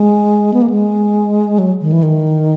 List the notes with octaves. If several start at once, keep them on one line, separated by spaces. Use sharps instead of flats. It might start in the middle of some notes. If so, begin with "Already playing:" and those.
Already playing: G#3
B3
A#3
G#3
F#3
D#3
E3
D#3